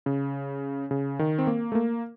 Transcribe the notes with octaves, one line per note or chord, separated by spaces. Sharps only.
C#3
C#3
D#3
C4
A#3
A3
A#3